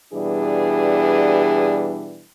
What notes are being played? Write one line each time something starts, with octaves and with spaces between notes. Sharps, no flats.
B2 E3 G3 D4 G#4